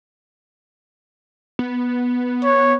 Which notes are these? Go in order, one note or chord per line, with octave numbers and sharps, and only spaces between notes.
B3
C#5